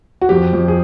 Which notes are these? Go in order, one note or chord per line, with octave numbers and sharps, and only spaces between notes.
F#4
F2 G4
F2
G#4